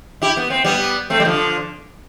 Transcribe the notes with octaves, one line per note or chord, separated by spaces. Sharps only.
E4 G4
B3
C4
G3 B3
A3 C4
G3
D3 F3